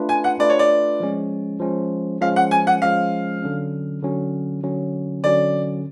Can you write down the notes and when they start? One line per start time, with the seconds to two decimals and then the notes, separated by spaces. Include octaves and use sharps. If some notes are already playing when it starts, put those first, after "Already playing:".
Already playing: A3 D4 F4 B4
0.09 G#5
0.24 F#5
0.39 A3 D4 F4 B4 D5
0.50 C#5
0.59 D5
1.00 F3 G#3 C#4
1.60 F3 G#3 C#4
2.21 F3 G#3 C#4 F5
2.36 F#5
2.51 G#5
2.67 F#5
2.82 F3 G#3 C#4 F5
3.42 D3 F#3 C#4
4.03 D3 F#3 C#4
4.63 D3 F#3 C#4
5.24 D3 F#3 C#4 D5